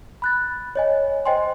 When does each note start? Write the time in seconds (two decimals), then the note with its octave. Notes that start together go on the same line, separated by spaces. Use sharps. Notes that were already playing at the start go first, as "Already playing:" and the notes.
0.22 B5 F#6 A6
0.75 C#5 D#5 G#5
1.26 C5 D#5 G5 G#5 C6